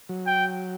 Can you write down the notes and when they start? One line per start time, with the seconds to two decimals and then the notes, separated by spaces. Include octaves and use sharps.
0.09 F#3
0.27 G5